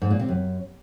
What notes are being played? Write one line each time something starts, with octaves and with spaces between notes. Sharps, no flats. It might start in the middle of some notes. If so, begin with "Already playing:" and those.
G#2
A#2
C3
F#2